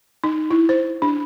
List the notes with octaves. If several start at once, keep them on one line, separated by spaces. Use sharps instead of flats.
D#4
E4
C5
D4